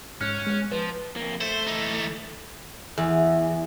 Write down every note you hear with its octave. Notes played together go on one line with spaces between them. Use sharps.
G#2 C#4 F6 F#6 C#7
G#3 B3
F3 B4
F2 A#3
A3 C5
E3 D#4
E2